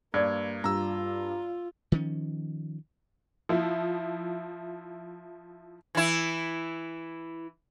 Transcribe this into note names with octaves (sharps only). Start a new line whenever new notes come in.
G2 A#3 D5 G#6
G2 F4 A#5 E6
D#3 F3 C#4
F3 E4
E3 E4